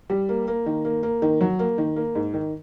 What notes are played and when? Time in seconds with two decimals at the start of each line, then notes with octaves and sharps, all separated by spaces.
0.10 G3
0.29 A#3
0.48 A#3
0.66 D#3
0.85 A#3
1.03 A#3
1.22 D#3
1.41 F#3
1.59 A#3
1.78 D#3
1.96 A#3
2.15 G#2
2.34 D#3